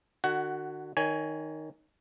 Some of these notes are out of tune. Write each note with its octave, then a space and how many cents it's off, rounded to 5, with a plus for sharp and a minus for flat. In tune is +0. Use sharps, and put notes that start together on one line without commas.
D3 +45 F#4 +0 F#5 +20
D#3 +0 C#5 +25 G#5 +0